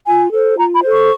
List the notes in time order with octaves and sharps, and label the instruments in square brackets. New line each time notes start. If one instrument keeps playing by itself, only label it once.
[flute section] F4 G#5
A4 C5
F4 A#5
B5
A4 C5
C#6